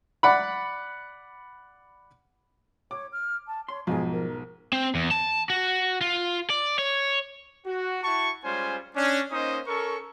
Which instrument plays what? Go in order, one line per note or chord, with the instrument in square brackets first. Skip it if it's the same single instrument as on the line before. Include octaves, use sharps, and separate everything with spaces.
[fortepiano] D5 F#5 B5
[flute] C#5 [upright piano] D6
[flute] F6
A5
[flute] C#5 [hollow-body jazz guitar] C6
[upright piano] B1 G#2 [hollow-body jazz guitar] F3 F4 [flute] G#4
[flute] A#4
[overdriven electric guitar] C4
E2
A5
F#4
F4
D5
C#5
[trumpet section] F#4
E4 F#4 A5 C#6
G3 G#3 C#4 F4 C5 G#5
C#4 D4
A#3 C#4 D#4 C5 D#5 D#6
C#4 A4 A#4 C#6